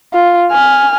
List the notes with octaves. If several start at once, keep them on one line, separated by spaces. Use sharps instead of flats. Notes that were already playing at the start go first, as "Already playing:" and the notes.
F4
G#5 F6